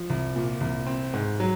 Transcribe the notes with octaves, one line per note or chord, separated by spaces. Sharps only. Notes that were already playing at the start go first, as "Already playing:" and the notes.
Already playing: F3
C2
A#2
C2
C4
G#2
F#3